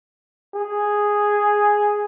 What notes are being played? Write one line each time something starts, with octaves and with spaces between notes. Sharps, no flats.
G#4